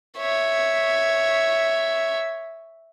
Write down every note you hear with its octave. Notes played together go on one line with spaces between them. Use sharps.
C#5 E5